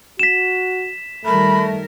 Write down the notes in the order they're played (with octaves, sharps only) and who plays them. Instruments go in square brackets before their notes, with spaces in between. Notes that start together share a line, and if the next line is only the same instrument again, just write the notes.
[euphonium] F#4 [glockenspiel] B6 E7
[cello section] D#3 G3 A#4 [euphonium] A3 [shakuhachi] B5